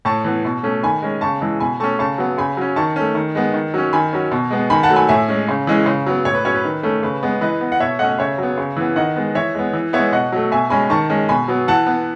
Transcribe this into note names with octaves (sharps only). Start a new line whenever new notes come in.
A2 A5 C#6
E3 B3
B2
A3 C#4
D#3 G#5 B5
G#3 C#4
C#3 A5 C#6
E3 G#3
B2 G#5 B5
A3 C#4 A5 C#6
C#3 A5 C#6
F#3 B3
C#3 G#5 B5
F#3 C#4
D#3 A5 C#6
A3 C#4
D#3
G#3 B3
D#3
F#3 C#4
D#3 G#5 B5
F#3 C#4
B2
G#3 B3
D#3 G#5 B5
F#5 A5
F#3 A3
G#5 B5
A2 E5 G#5
G#3 C#4
C#3
E3 G#3 C#4
C#3
F#3 B3
A2 C#5
B4
F#3 C#4 C#5
B4
D#3
A3 C#4
C#3 B4
G#3 B3
E3 B4 D#5
B3
F#5
B2 C#5 E5
A3 C#4 D#5 F#5
C#3 C#5 E5
F#3 B3
C#3
E3 B3
D#3 D#5 F#5
G#3 B3
E3 C#5 E5
G#3 B3
E3
G#3 B3 C#5 E5
B2 D#5 F#5
F#3 A3
B2 E5 G#5
G#3 C#4 G#5 B5
D#3 A5 C#6
G#3 C#4
B2 G#5 B5
F#3 B3
E3 F#5 A5
B3